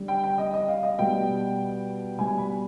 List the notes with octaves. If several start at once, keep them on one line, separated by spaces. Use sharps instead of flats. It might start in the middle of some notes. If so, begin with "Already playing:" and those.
Already playing: D3 G3
G5
G5
D#5
D#5
F5
D#5
B2 G3 G5
B2 G3 G#5
B5